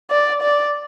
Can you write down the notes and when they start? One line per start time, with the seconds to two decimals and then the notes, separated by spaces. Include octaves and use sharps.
0.11 D5
0.42 D5